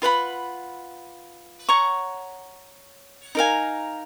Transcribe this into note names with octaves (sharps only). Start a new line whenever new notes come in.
F4 B4 F#5 B5
C#5 F#5 A#5 C#6
D#4 A#4 F5 G#5